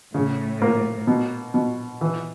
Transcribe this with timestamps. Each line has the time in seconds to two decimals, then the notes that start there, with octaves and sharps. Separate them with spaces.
0.14 A2 C#3
0.62 A#3
1.07 B2
1.54 B2
2.01 E3